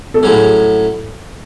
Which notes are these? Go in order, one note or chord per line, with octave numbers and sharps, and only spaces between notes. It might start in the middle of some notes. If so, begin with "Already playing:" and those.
A4
A2 F#3 C#4 G#4